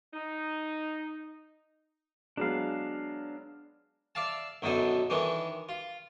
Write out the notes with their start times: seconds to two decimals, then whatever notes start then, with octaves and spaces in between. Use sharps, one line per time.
0.14 D#4
2.37 F#3 G#3 B3 D4 F5
4.15 D5 E5 F5 A5
4.62 B1 F#2 B2 D3 A4 D#6
5.10 D#3 E3 C#4 D4
5.69 F4